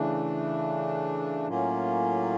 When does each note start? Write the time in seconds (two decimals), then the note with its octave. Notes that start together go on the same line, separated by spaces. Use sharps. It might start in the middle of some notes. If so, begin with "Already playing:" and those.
Already playing: C#3 E3 A3 D4
1.47 A2 F#3 A#3 C#4 F4